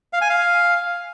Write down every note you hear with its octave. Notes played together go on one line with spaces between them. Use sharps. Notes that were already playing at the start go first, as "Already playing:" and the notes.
F5
G#5
F5